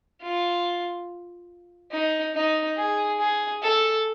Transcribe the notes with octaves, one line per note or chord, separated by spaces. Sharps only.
F4
D#4
D#4
G#4
G#4
A4